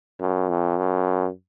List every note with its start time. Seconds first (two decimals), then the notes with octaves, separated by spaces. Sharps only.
0.21 F#2
0.49 F2
0.77 F#2